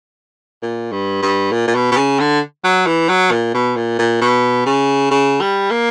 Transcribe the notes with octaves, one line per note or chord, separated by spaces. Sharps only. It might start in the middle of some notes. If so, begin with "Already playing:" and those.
A#2
G2
G2
A#2
A#2
B2
B2
C#3
D3
F#3
E3
F#3
A#2
B2
A#2
A#2
B2
C#3
C#3
G3
A#3